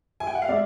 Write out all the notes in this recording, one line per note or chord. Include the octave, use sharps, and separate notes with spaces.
G#5
G5
F#5
F5
G#3 C4 D5 E5